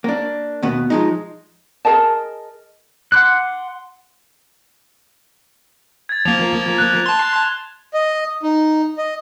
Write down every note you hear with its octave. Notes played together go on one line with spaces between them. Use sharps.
A#3 D4
D#2 B2 B3
F3 G#3 D#4
G#4 A#4 D#5 A5
F#5 C6 D6 F#6
G#6 A6
F3 A#3 F7
F#6
A5 C6
D#5
D#4
D#5